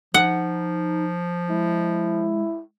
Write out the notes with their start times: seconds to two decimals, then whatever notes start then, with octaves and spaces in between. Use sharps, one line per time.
0.14 F3 D#4 F#5
1.50 G#3 E4